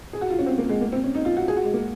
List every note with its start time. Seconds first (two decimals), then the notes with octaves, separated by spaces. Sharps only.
0.13 G#4
0.21 F#4
0.30 F4
0.39 C#4
0.46 C4
0.58 A#3
0.69 G#3
0.81 A#3
0.92 C4
1.04 C#4
1.15 D#4
1.25 F4
1.37 F#4
1.48 G#4
1.57 F#4
1.64 G#3
1.74 A#3